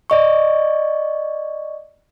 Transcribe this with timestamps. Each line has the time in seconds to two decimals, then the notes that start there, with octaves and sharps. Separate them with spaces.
0.10 D5 D#5 C#6